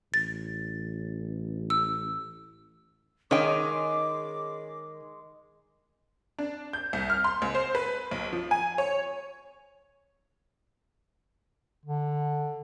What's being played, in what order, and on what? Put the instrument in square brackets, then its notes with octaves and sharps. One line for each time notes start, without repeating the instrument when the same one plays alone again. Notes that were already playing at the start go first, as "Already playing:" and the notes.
[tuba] A1 [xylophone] A6
[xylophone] E6
[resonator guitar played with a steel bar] D#3 [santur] G#3 [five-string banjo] C#4 G5 [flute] D6
[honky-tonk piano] D4
G6
C2
F6
C6
C#2
C5
B4
B1
F3
G#5
C#5
[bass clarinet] D3